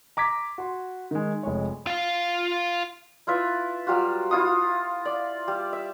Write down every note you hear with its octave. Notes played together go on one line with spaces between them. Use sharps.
A#5 D6 G#6 B6
F#4 C6
D#3 G#3
F1 G#3 C#5
F4 F5
E4 F4 B4 E5
F#3 G3 F4 F#4
E4 F4 D#6
D5
G3
E5